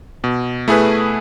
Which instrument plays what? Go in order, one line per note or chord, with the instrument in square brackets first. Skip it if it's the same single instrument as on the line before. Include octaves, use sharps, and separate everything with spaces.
[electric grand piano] B2
A3 E4 G#4 B4